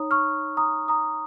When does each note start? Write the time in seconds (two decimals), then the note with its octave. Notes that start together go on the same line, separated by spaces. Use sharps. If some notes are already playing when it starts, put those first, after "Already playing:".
Already playing: D#4 C#5 A#5 D#6
0.11 C#6 F6
0.57 A#5 D#6
0.88 A#5 D#6